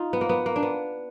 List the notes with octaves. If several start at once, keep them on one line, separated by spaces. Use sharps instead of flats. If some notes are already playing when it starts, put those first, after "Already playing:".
Already playing: D#4 F4
B3
A#3
B3
A#3
D4
B3